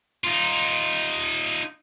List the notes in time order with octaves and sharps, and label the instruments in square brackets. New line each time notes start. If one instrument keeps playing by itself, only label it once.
[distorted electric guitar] D#4 F4